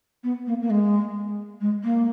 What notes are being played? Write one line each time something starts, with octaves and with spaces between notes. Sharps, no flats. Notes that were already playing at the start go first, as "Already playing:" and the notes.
B3
A#3
A#3
G#3
G#3
A#3